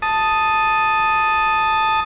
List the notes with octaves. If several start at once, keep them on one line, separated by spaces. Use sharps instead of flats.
A5 D#6